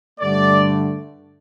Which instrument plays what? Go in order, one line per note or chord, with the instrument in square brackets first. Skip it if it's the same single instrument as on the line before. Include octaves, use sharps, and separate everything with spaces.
[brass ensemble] G2 D3 A3 D5